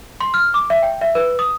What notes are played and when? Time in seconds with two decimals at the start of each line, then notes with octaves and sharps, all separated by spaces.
0.20 C6
0.34 F6
0.54 D6
0.70 E5
0.83 G5
1.01 E5
1.15 B4
1.39 D#6